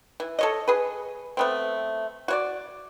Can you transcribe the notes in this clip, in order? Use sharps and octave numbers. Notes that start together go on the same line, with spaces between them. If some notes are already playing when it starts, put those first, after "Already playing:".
E3
A4 C#5 D#5
G#4 B4
A3 B3 C4
F#4 C#5 D5